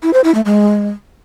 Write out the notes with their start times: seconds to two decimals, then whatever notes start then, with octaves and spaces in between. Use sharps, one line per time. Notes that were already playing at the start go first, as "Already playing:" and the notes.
0.03 E4
0.13 C5
0.24 E4
0.35 A3
0.45 G#3